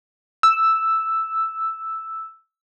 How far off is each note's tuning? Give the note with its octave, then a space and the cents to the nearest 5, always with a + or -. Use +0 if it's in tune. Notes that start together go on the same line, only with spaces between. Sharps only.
E6 +0